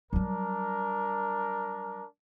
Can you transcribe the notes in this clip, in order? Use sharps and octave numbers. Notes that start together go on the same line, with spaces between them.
F#3 G3 D4 A#4